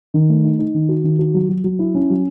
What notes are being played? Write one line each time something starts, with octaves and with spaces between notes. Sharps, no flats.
D#3
A3
D#4
D#4
D#3
F#4
D#3
F#4
F#3
F#3
F#3
E4
C#4
F#3